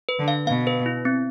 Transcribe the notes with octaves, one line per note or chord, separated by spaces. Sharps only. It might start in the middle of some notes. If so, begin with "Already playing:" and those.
B4
D3
F5
B2 F5
B4
E4
C4